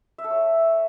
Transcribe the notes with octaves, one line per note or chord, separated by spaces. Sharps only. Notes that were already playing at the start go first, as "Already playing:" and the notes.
E5
A4
C#5